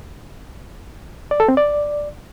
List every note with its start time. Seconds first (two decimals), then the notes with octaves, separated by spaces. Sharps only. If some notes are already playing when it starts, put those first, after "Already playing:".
1.31 D5
1.40 A4
1.48 C4
1.57 D5